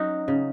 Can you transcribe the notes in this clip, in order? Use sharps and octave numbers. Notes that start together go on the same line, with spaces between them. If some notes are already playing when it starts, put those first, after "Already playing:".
Already playing: F#3 C#4 D#4 F#4
C#3